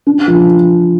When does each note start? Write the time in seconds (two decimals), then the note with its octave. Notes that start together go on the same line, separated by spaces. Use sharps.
0.07 D4
0.28 F3